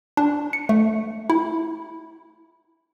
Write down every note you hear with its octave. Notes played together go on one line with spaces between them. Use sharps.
D4
C#7
A3
E4